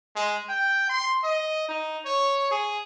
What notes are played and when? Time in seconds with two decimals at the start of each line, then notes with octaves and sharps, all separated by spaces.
0.16 G#3
0.49 G5
0.89 C6
1.24 D#5
1.69 D#4
2.05 C#5
2.51 G#4